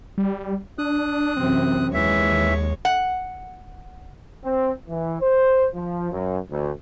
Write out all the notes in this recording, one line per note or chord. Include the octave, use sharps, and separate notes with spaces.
G3
D4 D#6 F#6
F#2 C3 E3 C4
D#2 E3 G#3 C#5 E5
F#5
C4
E3
C5
F3
F#2
D2